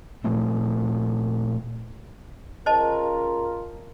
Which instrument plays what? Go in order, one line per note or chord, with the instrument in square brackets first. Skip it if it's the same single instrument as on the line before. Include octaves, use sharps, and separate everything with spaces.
[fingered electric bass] A#2 F3 A3 C4
[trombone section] C#3 F4 A#4 [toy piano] C5 D#5 A5